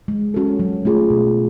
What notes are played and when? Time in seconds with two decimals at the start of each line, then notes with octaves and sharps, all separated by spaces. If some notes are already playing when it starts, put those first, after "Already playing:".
0.08 G#3
0.34 C#4 F#4 A4
0.59 F#3
0.85 A3 F4 G#4
1.10 B2